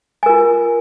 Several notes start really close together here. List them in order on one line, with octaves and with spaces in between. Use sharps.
G#5 A#4 F4